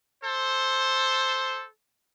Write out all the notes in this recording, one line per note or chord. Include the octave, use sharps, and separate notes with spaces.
A4 C5